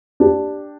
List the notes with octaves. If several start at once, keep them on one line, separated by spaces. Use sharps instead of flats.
D4 G4